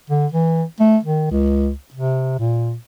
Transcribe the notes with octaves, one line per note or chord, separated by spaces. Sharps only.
D3
E3
A3
D#3
C#2
C3
A#2